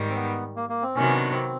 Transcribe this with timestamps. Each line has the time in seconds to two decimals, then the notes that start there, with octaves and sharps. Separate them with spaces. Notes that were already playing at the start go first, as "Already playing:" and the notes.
Already playing: G#2 D#3 G3
0.10 C4
0.16 B3
0.56 A#3
0.69 A#3
0.82 C4
0.96 C3 D#3 F#3 B3 C#4
1.14 D4
1.32 C4